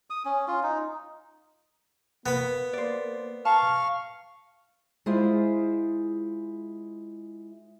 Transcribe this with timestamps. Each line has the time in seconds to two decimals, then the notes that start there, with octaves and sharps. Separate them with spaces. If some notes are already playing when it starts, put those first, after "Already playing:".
0.10 D#6
0.25 C#4
0.48 F4
0.63 D#4
2.26 A#3 B3 B5
2.73 C5 D5
3.45 F5 A5 A#5 C#6 F6
5.06 G#3 E4 F4 G#4 C5